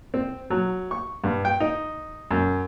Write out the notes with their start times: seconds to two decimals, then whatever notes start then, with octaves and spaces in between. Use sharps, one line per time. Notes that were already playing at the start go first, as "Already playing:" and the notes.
0.14 C4
0.50 F#3
0.91 C#6
1.24 G2
1.45 G5
1.60 D#4
2.31 F#2